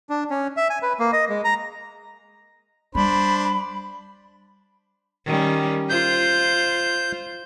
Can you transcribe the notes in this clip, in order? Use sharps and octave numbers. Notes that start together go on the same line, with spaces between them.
D4
C#4
E5
G#5
B4
A#3
D#5
G#3
A#5
G3 D4 C5 B5
D#3 G3 C#4
F4 C5 G6